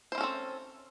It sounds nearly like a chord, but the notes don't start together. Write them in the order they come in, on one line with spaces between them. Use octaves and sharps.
C5 E4 C#4 A4 C4